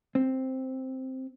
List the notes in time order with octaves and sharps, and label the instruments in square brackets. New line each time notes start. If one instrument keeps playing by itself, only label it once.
[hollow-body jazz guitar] C4